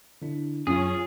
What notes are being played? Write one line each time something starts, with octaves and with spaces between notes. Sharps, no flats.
D3 D4 E4
F#2 F#3 C#4 F4 G#4